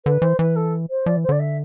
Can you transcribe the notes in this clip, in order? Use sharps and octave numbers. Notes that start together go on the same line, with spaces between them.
D3 B4
E3 C5
E3 B4
A4
C5
F3 D5
E3
C5
D3 D5
E5